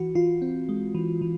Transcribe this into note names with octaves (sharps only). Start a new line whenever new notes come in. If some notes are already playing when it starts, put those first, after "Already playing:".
Already playing: E3 F#4
E3 F4
C4
G#3
E3
E3